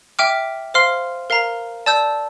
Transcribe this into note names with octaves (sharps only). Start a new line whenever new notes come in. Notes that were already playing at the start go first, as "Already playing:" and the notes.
E5 G5 D6 F6
C5 F5 C6 F6
A#4 F5 A#5
D5 A5 E6 G6